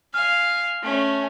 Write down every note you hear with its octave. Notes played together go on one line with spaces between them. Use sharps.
F5 G#5 F6
A3 C#4